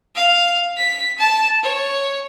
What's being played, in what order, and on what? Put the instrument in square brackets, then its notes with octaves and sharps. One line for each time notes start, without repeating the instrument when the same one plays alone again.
[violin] F5
B6
A5
C#5